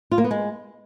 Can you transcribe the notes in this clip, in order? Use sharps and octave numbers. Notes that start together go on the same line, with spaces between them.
F4
A#3
B3
G#3